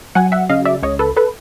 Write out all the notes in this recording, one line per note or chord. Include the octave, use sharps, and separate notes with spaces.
F#3 F#5 G#5
E5 F#5
C#3 D#5 F5
D5 E5
C#2 C#5 D#5
A4 B4
A4 B4